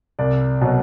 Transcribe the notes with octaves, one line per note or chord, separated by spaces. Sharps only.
C2 D5
B2 F#3